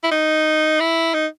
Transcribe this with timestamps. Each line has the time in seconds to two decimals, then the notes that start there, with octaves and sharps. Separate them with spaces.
0.03 E4
0.11 D#4
0.80 E4
1.14 D#4